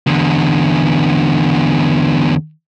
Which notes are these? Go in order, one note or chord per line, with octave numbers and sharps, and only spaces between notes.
E2 D3